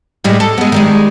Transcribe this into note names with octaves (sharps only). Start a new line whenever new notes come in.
A2 G3 G#3
A4
G#3 B3
D#3 G3 G#3